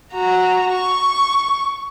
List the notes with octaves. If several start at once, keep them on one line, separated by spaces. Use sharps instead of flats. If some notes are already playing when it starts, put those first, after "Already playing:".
F#4 A#5
C#6